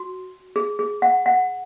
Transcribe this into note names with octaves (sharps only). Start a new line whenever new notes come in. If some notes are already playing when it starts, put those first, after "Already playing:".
Already playing: F#4
G#4
G#4
F#5
F#5